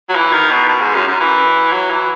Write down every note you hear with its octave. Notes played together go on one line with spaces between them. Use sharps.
F#3
E3
D#3
B2
B2
G#2
F#2
F#2
E3
F#3
E3